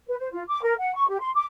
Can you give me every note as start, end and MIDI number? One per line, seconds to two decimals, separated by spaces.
0.07 0.15 71
0.19 0.27 72
0.32 0.43 65
0.48 0.61 86
0.63 0.74 70
0.78 0.93 78
0.95 1.06 85
1.08 1.18 67
1.20 1.29 84
1.34 1.44 86